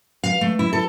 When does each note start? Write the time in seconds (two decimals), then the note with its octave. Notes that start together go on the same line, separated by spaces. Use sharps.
0.24 F5
0.41 A3
0.59 E4
0.73 A4